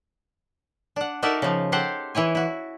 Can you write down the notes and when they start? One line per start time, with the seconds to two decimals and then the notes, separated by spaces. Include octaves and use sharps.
0.96 D4 F#5
1.22 D#4 F#4 A4 A#4 D5 E5
1.42 C#3 F3
1.72 G4 A4 C5 F#5
2.15 E3 E4 C#5 G#5
2.35 E4 F#4